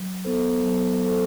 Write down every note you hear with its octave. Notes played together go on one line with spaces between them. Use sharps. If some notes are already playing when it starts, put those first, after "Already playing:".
Already playing: F#3
B3 E4 A4 C5
F#3
B3 E4 A4 C5